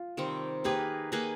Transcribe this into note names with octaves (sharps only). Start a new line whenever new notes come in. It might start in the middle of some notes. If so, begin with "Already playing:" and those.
Already playing: F4
C3 D#3 G3 C4
A#3 D#4 G4 G#4 B4
A#3 D#4 G#4 B4